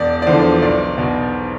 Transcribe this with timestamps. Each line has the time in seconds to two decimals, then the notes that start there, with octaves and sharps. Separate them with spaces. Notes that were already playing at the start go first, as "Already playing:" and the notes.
Already playing: E1 D5
0.22 D5
0.27 E2 D3 F3 C5
0.62 B1 D5
0.98 B2